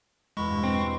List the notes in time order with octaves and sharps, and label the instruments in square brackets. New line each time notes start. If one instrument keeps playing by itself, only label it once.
[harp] E1 E2 B5 [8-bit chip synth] G#3 C#6
[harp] G2 B2
[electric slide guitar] C4